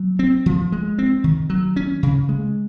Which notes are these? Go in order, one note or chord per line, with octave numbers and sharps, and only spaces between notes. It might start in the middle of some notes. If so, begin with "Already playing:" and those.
Already playing: F#3
C4
F3
G#3
C4
D#3
F#3
C#4
C#3
G#3